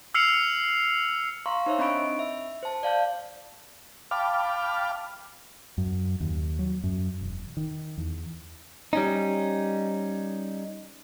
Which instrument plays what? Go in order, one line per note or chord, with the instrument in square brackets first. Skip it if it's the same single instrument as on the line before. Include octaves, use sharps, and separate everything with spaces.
[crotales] E6 F6 C7 C#7 F7
[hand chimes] F5 A#5 C6 C#6
D#4 C5 C#5 E5
C4 D4 D#5 B5 C#6 D7
E5
C5 A5
D5 F5 A5 G6
[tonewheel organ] F5 G5 A5 B5 D6 F6
[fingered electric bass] F#2
D#2
F#3
F#2
E1
D#3
E2
[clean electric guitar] G3 C#4 D#4